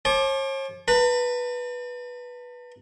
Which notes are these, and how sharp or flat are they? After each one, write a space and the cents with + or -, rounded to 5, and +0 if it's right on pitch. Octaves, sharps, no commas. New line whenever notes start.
C#5 -45 A5 -30 D6 +20
B4 -10 A5 +45